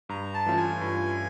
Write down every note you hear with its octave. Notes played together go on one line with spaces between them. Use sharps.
G2 A#5
A5
E3 A3 C#4 F4
G#5
G2